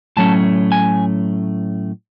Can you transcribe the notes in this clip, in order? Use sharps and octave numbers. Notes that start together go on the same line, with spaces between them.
A2 F#3 A3 C#4 A5
G#5